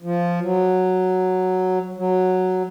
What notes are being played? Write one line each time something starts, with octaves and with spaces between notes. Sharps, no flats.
F3
F#3
F#3